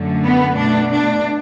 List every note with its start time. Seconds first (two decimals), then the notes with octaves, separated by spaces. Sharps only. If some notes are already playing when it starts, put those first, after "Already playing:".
Already playing: F#2 D3 A3
0.26 B3
0.58 B2 A3 D4
0.91 D4